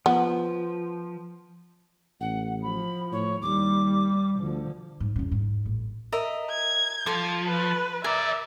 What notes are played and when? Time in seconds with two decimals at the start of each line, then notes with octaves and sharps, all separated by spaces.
0.06 F3 B3
2.20 A1 F#5
2.62 F3 B5
3.12 A2 C#5
3.42 D#2 G3 D6
4.39 D2 D3 F3
5.00 G#2
5.16 E2 C#3
5.31 G#2
5.66 A1
6.12 A#4 D#5 E5
6.50 G#6
7.06 F3 A4 D6
7.47 B4
8.04 G#4 A#4 D5 E5